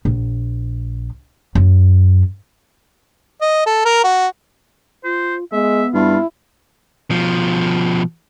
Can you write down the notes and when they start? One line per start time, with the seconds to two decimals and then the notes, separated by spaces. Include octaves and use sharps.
0.05 A#1
1.55 F#2
3.41 D#5
3.67 A4
3.85 A#4
4.04 F#4
5.04 F4 C5
5.52 G#3 B3 E5
5.94 G2 E4 F4
7.10 B2 F3